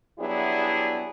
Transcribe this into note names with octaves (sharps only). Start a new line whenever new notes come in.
F#3 G3 B3 D4 E4 G#4